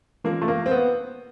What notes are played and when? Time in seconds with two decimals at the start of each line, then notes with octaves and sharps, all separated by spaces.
0.24 E3 G#3 A#3 C#4 F4 A4
0.42 A3
0.48 A#3
0.66 C4
0.71 B3